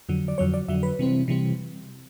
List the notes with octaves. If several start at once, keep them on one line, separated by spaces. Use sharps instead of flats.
F2 D3 F#3
D5
F2 D3 F#3 C#5
D5
F2 D3 F#3 E5
B4
C3 E3 G3 C4
C3 E3 G3 C4